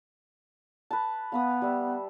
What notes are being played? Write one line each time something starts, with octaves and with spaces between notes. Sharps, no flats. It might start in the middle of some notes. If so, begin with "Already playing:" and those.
B4 A5
B3 F5 B5 D#6
G3 E5